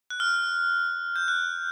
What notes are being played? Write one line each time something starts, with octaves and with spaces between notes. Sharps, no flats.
F#6
F6
G6
F#6